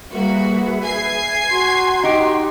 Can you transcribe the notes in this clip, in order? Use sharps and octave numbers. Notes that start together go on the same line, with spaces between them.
G3 A#3 F#4 G#4 B4 E5
G#5 G#6 C7
F#4 A#5 C6
D#4 G4